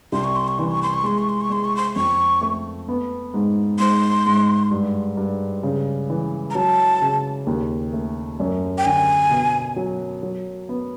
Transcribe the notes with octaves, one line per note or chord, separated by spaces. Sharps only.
C2 C6
C#6
C6
C#6
E3 C6
C#6
C6
C#6
G#3 C6
C#6
C6
C#6
G#3 C6
C#6
C6
F2 C#6
A3
B3
G#2
G#2 C6
G#2
G2
G2
C#3
E3
A#5
F#3 A5
C#3
D#2
A3
F#2
G5
D3 G#5
B2
F#3
F#3
B3